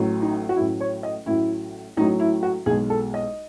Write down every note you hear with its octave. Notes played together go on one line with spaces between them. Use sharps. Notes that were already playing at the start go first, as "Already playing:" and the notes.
Already playing: A1 A2 F#3
D#4
F#4
A1 A2 F#3 E4
C#5
D#5
A1 A2 F#3 E4
A1 A2 F#3 D#4
E4
F#4
B1 B2 G#3 G#4
A4
D#5